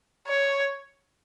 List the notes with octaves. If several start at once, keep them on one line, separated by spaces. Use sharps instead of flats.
C#5